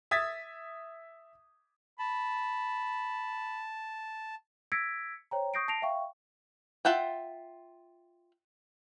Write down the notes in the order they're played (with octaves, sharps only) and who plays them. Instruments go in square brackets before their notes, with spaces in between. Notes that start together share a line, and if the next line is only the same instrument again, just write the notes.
[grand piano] E5 D#6 G#6 A6 B6
[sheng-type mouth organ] A5 [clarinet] B5
[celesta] E6 G#6 A#6 B6 C#7 D7
C5 C#5 G5 A#5
C#6 D#6 G6 A#6 C7 D7
A5 A#6 C7 D7 F7
E5 F5 G5 C#6
[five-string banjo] F4 E5 F#5 G5